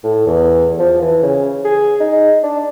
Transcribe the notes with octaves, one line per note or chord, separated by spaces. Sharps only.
A2
E2
F3
E3
C#3
G#4
D#4
D4